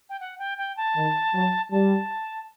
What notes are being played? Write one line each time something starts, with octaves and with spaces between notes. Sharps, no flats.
G5
F#5
G5
G5
A5
D#3
F#3
G3 A5